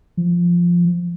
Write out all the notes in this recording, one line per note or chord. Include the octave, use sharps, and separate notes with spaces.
F3